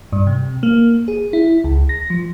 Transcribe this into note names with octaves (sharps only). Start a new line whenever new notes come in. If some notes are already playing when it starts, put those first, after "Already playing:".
G2
C3
A#3
G#4
E4
C#2
A#6
F3